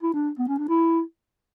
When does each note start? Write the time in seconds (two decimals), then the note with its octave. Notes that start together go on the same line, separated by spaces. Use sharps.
0.03 E4
0.14 D4
0.39 B3
0.48 C#4
0.58 D4
0.68 E4